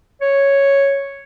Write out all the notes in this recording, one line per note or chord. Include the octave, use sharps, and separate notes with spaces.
C#5